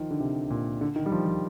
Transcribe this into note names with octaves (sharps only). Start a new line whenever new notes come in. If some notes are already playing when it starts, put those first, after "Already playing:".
Already playing: D#3 F3
D3
C3
A#2
D3
D#3
G3
F3
F3